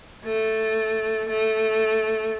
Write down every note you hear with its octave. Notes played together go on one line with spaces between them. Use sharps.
A3
A3